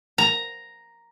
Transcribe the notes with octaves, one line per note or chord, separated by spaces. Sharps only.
A#5